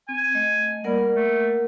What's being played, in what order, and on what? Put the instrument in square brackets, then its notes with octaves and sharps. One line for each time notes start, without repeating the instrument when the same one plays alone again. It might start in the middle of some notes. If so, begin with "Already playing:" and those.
[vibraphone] C4 [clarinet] G#5
[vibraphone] A3 D#5
[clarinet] G3 [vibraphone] A#3 A#4 F#5
[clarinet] A3